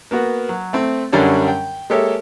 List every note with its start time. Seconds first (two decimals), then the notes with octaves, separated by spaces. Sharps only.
0.11 A#3 B3 F#4
0.49 F#3
0.73 A3 C4
1.12 F#2 D3 F#3 G3 D4 C#5
1.48 G5
1.90 G#3 A#3 G4 A4 C#5 E5